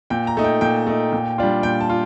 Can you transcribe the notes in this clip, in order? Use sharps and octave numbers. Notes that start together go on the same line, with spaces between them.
A#2 G5
A#5
A3 D#4
G5
A#2 G5
A3 D#4
A#2
G3 D4 F4
A#2 G5
A5
F4